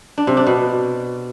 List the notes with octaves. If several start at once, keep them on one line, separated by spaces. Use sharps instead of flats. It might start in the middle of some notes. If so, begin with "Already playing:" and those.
D4
C3
D4
B2